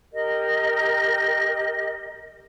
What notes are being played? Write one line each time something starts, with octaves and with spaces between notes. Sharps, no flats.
G4 A#4 D#5